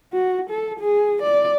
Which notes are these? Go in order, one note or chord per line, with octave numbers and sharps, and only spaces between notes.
F#4
A4
G#4
D5